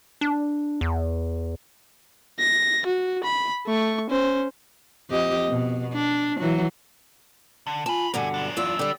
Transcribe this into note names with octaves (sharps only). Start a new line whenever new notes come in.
D4
E2
A#6
F#4
B5
A3 C#6
C#4 C5
F2 G4 D#5
B2
D4
E3 F#3 F#4
D3
F4 G#5 A5 B5
G2 B2 D3 A#4 F#5 G#5
F#2 D4
E2 G2 F4 E6
D3 G3 G4 D5